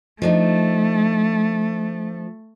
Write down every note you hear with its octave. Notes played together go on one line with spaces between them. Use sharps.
F3 A3 D4 D#4